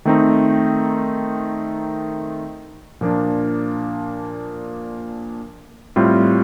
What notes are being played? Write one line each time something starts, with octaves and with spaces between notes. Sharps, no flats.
D#3 A3 C4 D#4
A#2 F3 A#3 D4
A2 G3 C4 F4